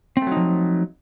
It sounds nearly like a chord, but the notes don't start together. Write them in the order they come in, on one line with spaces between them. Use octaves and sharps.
C4 A3 F#3 D#4 F3